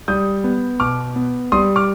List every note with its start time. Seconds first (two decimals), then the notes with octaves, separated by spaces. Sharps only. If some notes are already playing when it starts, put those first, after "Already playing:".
0.08 G3 D#6 G6
0.44 B3
0.80 B2 D6 F6
1.16 B3
1.52 G3 C6 D#6
1.76 D6 F6